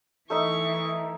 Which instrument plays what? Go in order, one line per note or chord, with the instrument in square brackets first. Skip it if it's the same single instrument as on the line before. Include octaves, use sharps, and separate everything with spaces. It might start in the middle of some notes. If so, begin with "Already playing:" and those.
[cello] E3 [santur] A3 D#4 E5 [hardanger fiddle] C#6